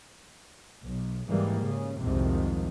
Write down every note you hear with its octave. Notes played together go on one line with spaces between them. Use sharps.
B1
G#2 E3 G3 A#3
C#3
C2 F2 G#2 C3 D#3 F3